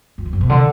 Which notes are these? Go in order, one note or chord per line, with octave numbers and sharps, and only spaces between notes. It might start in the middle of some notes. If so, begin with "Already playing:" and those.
F#2
E2
F#2
B2
D3